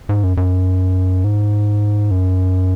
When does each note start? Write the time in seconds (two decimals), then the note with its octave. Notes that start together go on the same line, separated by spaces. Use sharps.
0.09 G#2
0.23 F#2
0.37 F#2
1.24 G#2
2.11 F#2